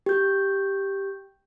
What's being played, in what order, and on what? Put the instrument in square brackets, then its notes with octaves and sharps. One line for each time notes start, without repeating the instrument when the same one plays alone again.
[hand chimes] G4 G6